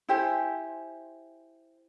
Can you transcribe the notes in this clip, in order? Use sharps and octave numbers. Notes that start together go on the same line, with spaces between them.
E4 G4 C5 G#5